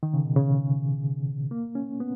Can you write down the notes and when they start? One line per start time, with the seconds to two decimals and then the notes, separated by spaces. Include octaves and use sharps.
0.03 D#3
0.14 C#3
0.25 B2
0.36 C#3
1.51 A#3
1.75 C#4
2.00 B3